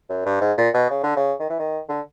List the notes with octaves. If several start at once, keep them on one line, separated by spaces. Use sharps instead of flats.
F#2
G2
G#2
A#2
B2
C#3
D3
C#3
D#3
E3
D#3
D3